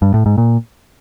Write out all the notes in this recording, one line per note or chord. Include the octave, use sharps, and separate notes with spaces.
G2
A2
G#2
A#2